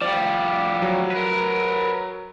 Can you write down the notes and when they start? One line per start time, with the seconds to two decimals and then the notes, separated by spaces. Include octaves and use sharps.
0.01 F3 G3 D5
0.82 F#3
1.11 A#4 B4